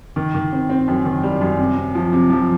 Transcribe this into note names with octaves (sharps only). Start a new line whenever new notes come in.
D#3
D#3
C4
C4
F#2
D#3
G3
F#2
C3
C3
F3
C3
F3